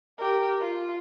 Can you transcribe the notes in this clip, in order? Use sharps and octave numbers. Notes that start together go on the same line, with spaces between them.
G4 A#4
F4